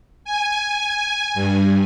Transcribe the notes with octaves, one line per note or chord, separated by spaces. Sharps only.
G#5
G2